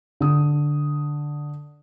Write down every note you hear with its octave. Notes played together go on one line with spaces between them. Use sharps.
D3 D#6